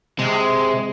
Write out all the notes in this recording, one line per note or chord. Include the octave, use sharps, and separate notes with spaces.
C3 G#3